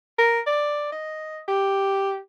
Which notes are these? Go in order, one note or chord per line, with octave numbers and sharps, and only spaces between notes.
A#4
D5
D#5
G4